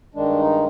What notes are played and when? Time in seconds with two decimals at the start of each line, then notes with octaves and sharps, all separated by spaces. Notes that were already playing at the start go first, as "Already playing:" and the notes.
0.15 G2 D#3 G#3 D4
0.39 D#4